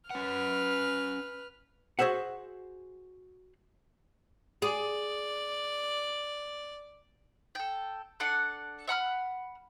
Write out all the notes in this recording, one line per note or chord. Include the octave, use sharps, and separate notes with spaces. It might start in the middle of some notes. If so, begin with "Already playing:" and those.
C#4 B4 F#5 F6
F#4 G#4 C5 E5 F#5
G#4 D5
A4 G5
D4 A4 D5 F#5
E5 F#5 B5 F6